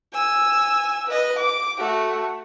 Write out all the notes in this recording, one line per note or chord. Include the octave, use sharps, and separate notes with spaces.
G#5 E6
B4 D#5
D6
A3 F#4